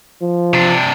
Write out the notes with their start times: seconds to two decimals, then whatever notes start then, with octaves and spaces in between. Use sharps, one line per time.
0.22 F3
0.53 C3 D4